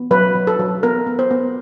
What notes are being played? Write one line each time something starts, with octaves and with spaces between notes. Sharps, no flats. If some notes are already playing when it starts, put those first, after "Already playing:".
Already playing: B3
F#3 B4
F#3
A4
F#3
B3 A#4
B3
C5
B3